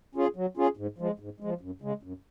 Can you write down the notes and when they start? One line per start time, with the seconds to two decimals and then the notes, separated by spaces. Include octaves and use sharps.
0.15 C#4 F4 G#4
0.36 F#3
0.57 C#4 F4 G#4
0.77 G#2
0.98 F3 G#3
1.19 G#2
1.40 F3 G#3
1.61 F#2
1.82 C#3 G#3
2.03 F#2